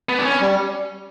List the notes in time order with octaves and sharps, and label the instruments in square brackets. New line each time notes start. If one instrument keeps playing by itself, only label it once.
[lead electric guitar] B3
D4
C#4
[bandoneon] G3